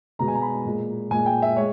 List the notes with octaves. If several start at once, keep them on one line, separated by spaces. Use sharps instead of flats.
B2 G#3 A#5
G#5
A#5
B5
A#2 G#3
A#2 G#3 G#5
G5
E5
G#3 C#5